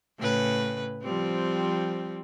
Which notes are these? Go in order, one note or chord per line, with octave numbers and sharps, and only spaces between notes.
A2 C#3 B4
F3 G3 C4